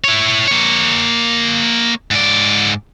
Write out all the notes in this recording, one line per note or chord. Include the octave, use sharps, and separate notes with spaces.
E4 C#5
A#3 C#5
G#2 D5